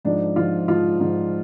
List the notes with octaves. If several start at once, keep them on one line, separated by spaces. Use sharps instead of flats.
G#2 F3 D4
G#2 F3 F4
G#2 F3 F4
G#2 F3